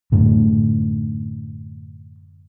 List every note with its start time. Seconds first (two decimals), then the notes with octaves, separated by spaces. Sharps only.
0.12 F#2 A2 D3